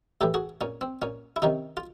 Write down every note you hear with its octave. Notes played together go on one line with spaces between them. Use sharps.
A2 E3 G4 A4
F#4 G#4
A#2 C#4
C4
A#2 C#4
E4
C3 D#3 C#4 D#4
F4